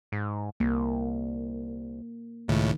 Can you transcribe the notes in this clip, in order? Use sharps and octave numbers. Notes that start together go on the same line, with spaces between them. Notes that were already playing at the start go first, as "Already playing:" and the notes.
G#2
C2 A#3
C#2 A2 D#3